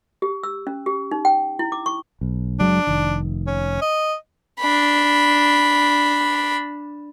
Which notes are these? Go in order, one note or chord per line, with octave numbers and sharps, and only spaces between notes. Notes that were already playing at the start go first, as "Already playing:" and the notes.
G4
E6
C#4
G4
D#4
G5
E4
D6
C#6
B1
F#1 F#3 G#3 D4
F1 D#3
C#4
D#5
D4 B5